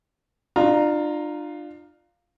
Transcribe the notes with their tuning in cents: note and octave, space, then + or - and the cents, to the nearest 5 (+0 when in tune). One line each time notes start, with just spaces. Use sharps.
D4 +35 F4 +0 A#5 +0